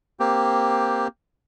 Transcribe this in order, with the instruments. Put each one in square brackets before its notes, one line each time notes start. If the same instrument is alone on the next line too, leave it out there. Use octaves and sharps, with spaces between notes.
[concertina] A#3 C4 G4